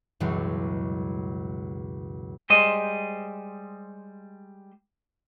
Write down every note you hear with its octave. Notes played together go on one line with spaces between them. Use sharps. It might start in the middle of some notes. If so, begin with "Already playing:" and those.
C#2 F#2 B2 E3 G3 G#3
G3 G#3 C5 D#5